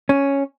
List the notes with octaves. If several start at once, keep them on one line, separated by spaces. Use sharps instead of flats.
C#4